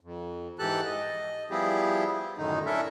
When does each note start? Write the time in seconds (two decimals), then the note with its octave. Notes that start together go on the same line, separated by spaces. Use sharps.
0.01 F2
0.59 G#2 E3 G4 A4 A5 F#6
0.86 D#5
1.51 F3 G3 B3 E4 G4 G#4
2.38 F#2 A2 D3 D#3 D#4
2.66 C#4 D4 E4 A4 A#4 E5